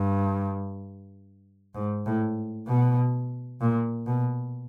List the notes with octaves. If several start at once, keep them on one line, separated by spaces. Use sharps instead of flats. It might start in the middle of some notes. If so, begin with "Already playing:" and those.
Already playing: G2
G#2
A2
B2
A#2
B2